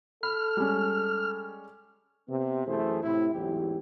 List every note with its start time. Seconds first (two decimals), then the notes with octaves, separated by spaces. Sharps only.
0.23 A4 B5 F6
0.57 G3 G#3 C#4
2.29 C3 B3
2.67 F#2 E3 A3 E4 G#4 C5
3.03 A2 C3 E4
3.34 A1 E2 G#2 F#3 E4 G4